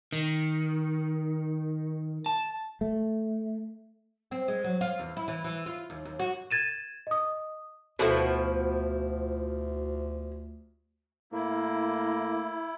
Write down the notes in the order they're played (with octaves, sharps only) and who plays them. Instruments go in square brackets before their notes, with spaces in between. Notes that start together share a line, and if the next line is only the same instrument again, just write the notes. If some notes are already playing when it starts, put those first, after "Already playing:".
[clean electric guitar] D#3
A5
[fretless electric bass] A3
[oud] C4
G#3
F#3
F4
E2
E4
E3
E3
F4
D#2
D#2
F#4
[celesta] G#6 A6 D#7 E7
D#5 D#6
[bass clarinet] D2 [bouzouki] B2 F3 E4 [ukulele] F#4 A4 B4
[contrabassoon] A2 [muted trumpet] A#3 [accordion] E4